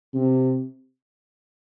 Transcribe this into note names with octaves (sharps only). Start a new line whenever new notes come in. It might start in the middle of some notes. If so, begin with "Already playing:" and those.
C3